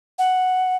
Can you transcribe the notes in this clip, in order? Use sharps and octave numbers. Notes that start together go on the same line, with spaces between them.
F#5